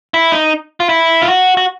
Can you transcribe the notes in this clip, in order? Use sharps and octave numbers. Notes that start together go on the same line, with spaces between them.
E4
D#4
F4
E4
F4
F#4
F#4